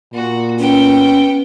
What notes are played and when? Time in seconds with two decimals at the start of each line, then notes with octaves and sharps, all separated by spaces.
0.14 A#2 F#4
0.59 B3 C#4 G5